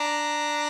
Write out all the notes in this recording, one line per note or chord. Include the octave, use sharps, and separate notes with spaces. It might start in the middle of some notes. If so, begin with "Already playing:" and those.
Already playing: D4 A#5